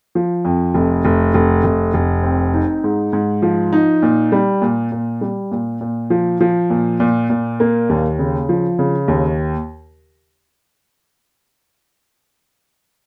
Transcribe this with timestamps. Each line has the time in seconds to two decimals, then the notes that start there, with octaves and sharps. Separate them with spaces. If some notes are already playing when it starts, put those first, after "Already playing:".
0.15 F3
0.45 F2
0.74 F1
1.05 F1
1.34 F1
1.64 F1
1.94 F1
2.23 C4
2.54 D#4
2.84 G#2
3.13 G#2
3.42 F3
3.73 D#4
4.02 A#2
4.32 G3
4.62 A#2
4.92 A#2
5.21 G3
5.51 A#2
5.81 A#2
6.10 F3
6.41 F3
6.70 A#2
7.00 A#2
7.30 A#2
7.60 A#3
7.89 D#2
8.19 C#3
8.49 F3
8.79 C#3
9.08 D#2